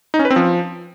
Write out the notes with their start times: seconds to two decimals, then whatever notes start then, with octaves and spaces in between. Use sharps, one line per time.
0.14 D#4
0.19 C#4
0.25 B4
0.30 C4
0.36 F3